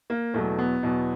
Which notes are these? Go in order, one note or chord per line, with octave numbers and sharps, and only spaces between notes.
A#3
E2 B2 F#3 A3
B3
E2 B2 F#3